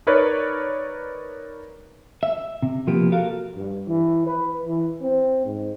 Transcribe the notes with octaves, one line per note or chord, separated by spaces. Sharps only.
D#4 A#4 B4 C#5 D5
E5
C3
F3 A#3 B3 G4
F#4 A4 A#4 F5
G2
E3
B4
E3
C4
G#2